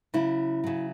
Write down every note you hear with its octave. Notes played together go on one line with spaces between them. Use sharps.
C#3 F#3 E4
C#3 F#3